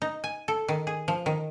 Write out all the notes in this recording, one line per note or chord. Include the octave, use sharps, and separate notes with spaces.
D#4
G#5
A4
D#3
G#4
F3
D#3